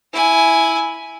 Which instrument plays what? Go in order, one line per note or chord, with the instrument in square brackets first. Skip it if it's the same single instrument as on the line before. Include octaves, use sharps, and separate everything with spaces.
[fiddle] E4 G#5